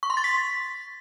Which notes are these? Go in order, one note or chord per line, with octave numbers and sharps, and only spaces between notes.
C#6
C6
A6
B6